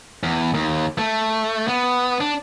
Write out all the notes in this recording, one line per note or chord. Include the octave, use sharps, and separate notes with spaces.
E2
D#2
A3
B3
D4